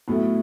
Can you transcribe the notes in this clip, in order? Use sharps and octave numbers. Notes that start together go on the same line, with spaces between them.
A2 F#3 A3 B3 E4